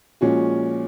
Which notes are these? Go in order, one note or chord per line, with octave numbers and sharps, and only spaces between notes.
A#2 F3 G#3 C#4 F#4